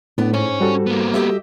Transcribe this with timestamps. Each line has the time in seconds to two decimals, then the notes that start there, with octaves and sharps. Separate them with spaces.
0.18 A2 B3 D4
0.34 G#2 C#4 C#5
0.60 G3 F#4 A4
0.86 A#3 B3
1.14 G4 D#5 E5